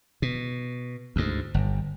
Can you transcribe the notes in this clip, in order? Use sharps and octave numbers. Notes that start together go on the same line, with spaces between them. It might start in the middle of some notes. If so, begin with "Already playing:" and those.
B2
D2 G#2
G1